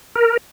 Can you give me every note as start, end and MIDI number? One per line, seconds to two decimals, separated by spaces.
0.15 0.37 70